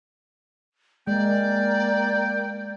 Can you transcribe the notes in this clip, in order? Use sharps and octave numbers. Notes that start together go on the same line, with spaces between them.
G#3 A#3 D5 G5